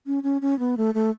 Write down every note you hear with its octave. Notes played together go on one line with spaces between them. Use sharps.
C#4
C#4
C#4
B3
A3
A3